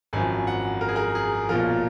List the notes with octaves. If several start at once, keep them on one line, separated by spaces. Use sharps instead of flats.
G#1 F#2 F3 G#5
F#5
A#4
G#4
A#4
G#4
B1 A#2 F3 A#4